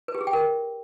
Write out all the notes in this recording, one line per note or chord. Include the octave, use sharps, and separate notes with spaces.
B4
G4
G#4
G5
A#4